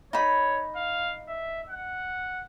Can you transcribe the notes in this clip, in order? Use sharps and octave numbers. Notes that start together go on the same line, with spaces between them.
D#4 C#5 B5
F5
E5
F#5